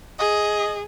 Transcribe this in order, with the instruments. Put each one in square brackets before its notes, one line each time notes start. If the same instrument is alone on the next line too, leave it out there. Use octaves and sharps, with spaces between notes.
[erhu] G#4 [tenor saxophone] D#5